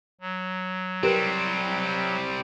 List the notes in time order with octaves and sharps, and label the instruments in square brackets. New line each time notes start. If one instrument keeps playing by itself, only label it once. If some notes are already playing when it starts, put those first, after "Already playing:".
[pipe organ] F#3
[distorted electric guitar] G3 C4 [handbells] G4 A#4 B4